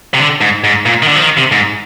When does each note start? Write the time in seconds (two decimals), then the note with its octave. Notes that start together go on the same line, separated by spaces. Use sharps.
0.14 C3
0.20 D3
0.41 G#2
0.64 G#2
0.86 A#2
1.02 D#3
1.08 D3
1.16 F3
1.22 D#3
1.37 C3
1.52 G#2